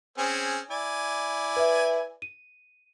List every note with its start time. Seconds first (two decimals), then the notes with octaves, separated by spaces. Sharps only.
0.18 C4 C#4 G#4
0.71 E4 D5 G#5
1.56 B4 E5
2.22 D#7